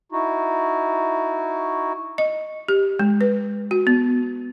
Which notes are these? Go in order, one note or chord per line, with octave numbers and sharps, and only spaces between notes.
D#4 E4 F#4
D#5
G4
G#3
B4
F#4
B3